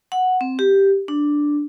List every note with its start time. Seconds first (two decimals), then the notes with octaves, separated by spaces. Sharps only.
0.12 F#5
0.41 C4
0.59 G4
1.08 D4